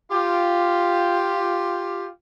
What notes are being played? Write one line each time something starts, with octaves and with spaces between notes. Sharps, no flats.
F4 G4